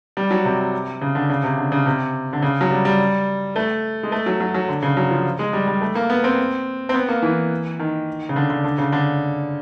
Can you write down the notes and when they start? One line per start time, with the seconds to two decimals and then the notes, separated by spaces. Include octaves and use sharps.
0.17 G3
0.31 F#3
0.45 C3
1.01 C#3
1.15 D3
1.30 C#3
1.43 C3
1.58 D3
1.72 C#3
1.86 C3
2.33 D3
2.42 C#3
2.61 F#3
2.71 G3
2.85 G3
3.56 A3
4.03 G#3
4.12 A3
4.26 F#3
4.40 F#3
4.54 F#3
4.68 D3
4.82 C#3
4.97 F#3
5.11 F3
5.39 G#3
5.53 G3
5.67 G3
5.81 A3
5.95 A#3
6.10 B3
6.24 C4
6.89 C4
6.94 B3
7.09 A#3
7.22 E3
7.79 D#3
8.29 C#3
8.36 D3
8.50 D3
8.64 D3
8.78 C#3
8.92 D3